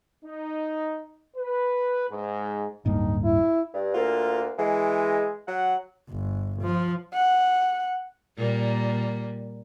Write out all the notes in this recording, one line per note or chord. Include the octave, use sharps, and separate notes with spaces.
D#4
B4
G#2
D1 G2 A#3 D#4
E4
G2
D2 A#3 F4
E3 G#3
F#3 F#5
G1
F3
F#5
A#2 G3 A#3